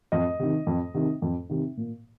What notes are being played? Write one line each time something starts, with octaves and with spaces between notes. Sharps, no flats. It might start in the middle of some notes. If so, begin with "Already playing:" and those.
F2 D#5
C3 D#3
F2
C3 D#3
F2
C3 D#3
A#2